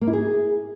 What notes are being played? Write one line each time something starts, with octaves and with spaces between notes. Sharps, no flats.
A#3
E4
G#4